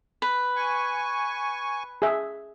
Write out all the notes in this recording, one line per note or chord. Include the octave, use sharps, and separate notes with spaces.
B4
G#5 C#6
G#4 E5